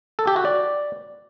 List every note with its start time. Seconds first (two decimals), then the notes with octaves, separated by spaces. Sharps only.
0.19 A4
0.27 G4
0.36 F#4
0.45 D5